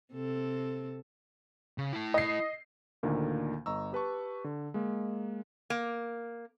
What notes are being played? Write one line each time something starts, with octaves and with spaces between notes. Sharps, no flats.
C3 C4 A4
C#3
E4 A5
D#5 C7
D2 A#2 D3 D#3 A#3
G1 D#5 A#5 C#6 E6
G4 B4 A5 C#6
D3
G#3 A#3
A#3